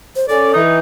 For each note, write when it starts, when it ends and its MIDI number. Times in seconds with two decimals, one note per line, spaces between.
0.16 0.26 72
0.29 0.52 61
0.29 0.60 69
0.29 0.52 74
0.53 0.78 52
0.53 0.78 63